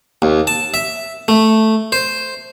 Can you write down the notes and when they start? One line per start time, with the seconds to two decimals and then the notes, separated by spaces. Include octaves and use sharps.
0.22 D#2
0.47 A5
0.74 E5
1.28 A3
1.92 C5